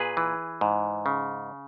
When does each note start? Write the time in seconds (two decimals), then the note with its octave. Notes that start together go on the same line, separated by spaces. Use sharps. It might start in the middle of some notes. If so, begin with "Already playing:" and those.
Already playing: A#2 G#4 B4
0.17 E3
0.61 G#2
1.06 C#3